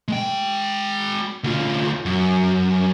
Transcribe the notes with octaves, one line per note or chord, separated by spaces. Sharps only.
G#3 G5
D2 F4
F#2